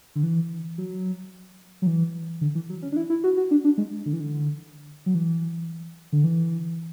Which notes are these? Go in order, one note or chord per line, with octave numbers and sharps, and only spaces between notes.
D3
E3
F#3
F#3
E3
D3
E3
F#3
C#4
D4
E4
E4
F#4
F#4
D4
D4
G#3
D3
E3
D3
F#3
E3
D3
E3